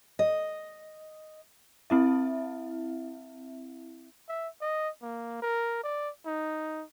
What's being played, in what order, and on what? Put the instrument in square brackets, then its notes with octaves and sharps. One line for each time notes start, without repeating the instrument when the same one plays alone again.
[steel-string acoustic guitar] D#5
[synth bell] C4 E4 E5
[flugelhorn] E5
D#5
A#3
A#4
D5
D#4